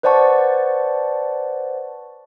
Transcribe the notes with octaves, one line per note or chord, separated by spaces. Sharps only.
B4 C5 D5 F#5 A5 C#6